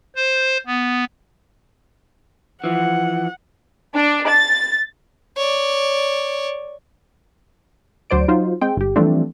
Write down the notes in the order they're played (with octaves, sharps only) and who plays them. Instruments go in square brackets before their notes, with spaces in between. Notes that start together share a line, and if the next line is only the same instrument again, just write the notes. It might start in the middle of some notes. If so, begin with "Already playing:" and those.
[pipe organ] C5
B3
[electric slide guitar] E3 F3 [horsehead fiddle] F#5
[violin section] D4
A6
[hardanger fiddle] C#5 D5
[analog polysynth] D2 F#3 C5 D5 D7
F#3 D#4 F4 C5
G#3 C4 G5
G1 G4
E3 F3 G3 A3 C4 D4